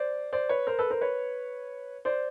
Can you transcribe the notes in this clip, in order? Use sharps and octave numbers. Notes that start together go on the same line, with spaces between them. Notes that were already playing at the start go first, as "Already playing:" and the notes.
Already playing: C5 D5
C5 D5
B4 C#5
A#4 C5
A4 B4
A#4 C5
B4 C#5
C5 D5